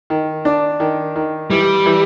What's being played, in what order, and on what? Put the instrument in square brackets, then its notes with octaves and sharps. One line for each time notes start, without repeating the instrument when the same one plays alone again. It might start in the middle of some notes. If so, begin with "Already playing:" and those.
[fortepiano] D#3
D4
D#3
D#3
[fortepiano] E3 [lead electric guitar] G3
[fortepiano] E3